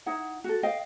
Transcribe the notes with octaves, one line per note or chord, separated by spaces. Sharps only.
D#4 E4 F#5
F#4 A4
D#5 F5 G5